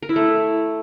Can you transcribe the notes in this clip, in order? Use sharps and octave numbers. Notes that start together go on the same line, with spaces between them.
A#4
E4
A3